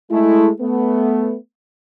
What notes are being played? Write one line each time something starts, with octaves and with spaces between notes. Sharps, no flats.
G#3 A3 E4
A3 B3